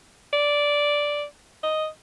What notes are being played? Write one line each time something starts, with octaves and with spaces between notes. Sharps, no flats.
D5
D#5